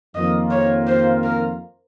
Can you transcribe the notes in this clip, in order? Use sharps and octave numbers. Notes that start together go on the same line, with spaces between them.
F2 D#3 A#3 F4 D#5
C#5
C5
A#4